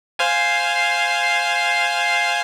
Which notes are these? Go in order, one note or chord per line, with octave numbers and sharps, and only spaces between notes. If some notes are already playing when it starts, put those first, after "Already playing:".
C5 F5 G#5